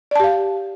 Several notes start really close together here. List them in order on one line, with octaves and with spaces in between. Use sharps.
D5 A5 G4 F5